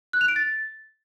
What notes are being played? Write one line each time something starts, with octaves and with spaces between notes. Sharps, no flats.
F#6
F7
D7
A6